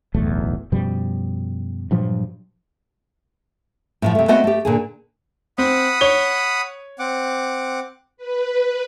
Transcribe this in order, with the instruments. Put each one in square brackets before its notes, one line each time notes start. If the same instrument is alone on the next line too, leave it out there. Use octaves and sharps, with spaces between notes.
[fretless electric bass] D1 B1 E2 A3
F#2 B2 F3 G3
G2 A#2 F3 F#3
[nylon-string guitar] A2 D3 F3
C3 A3
A3 B3 C4 F#4 D#5 F#5
A3 G4
A#2 D3 G#4
[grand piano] C4 [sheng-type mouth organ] F#5 B5 D#6
[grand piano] C#5 G7
[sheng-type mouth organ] C4 F#5 D6
[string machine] B4